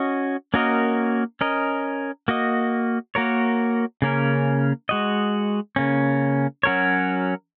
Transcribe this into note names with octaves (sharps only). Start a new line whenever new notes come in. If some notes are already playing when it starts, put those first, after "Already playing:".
Already playing: C#4 F#4 D#5
A#3 C#4 F#4 A#4 D#5
C#4 A#4 D#5
A#3 F#4 D#5
A#3 F#4 A#4 C#5
C#3 A#3 C#4 A#4
G#3 F#4 D#5
C#3 A#3 C#4
F#3 C#4 F#4 A#4 C#5